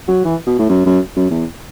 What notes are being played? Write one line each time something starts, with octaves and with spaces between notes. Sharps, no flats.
F#3
E3
B2
A2
F#2
F#2
F#2
E2